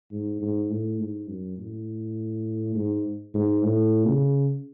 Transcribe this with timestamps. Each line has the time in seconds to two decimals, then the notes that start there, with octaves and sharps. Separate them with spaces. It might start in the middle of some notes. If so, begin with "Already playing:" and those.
0.12 G#2
0.41 G#2
0.71 A2
1.00 G#2
1.29 F#2
1.59 A2
2.75 G#2
3.34 G#2
3.63 A2
4.08 C#3